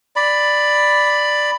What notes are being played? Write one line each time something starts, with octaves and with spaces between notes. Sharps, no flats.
D5 B5